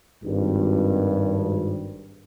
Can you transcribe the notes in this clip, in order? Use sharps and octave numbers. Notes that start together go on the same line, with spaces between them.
G#1 G2